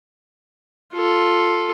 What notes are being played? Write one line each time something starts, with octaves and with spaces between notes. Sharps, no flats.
F4 A4